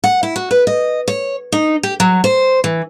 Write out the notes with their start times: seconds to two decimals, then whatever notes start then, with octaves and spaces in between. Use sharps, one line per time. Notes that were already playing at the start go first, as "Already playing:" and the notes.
0.04 F#5
0.23 E4
0.36 F#4
0.51 B4
0.67 D#5
1.08 C#5
1.52 D#4
1.83 G4
2.00 F#3
2.24 C5
2.64 E3